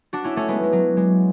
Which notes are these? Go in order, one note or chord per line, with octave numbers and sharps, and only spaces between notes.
D4 F#4
C#4 E4
A3 C#4
G#3 B3
G#3
F#3
G#3